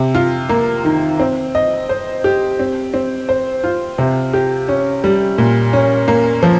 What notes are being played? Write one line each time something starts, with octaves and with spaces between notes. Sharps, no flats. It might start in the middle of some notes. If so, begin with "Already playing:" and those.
Already playing: C3
F4
A#3
D#3
C4
D#5
C5
G4
C4
C4
C5
F4
C3
G4
C#4
G3
A#2
C#4
A#3
F3